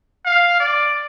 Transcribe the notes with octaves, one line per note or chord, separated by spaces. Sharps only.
F5
D5